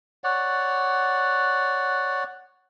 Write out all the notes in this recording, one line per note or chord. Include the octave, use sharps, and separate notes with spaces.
C#5 D5 F#5